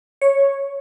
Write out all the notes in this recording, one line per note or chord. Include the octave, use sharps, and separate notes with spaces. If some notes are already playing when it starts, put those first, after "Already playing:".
C#5